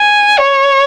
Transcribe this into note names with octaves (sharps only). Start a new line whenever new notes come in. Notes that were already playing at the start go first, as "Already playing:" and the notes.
Already playing: G#5
C#5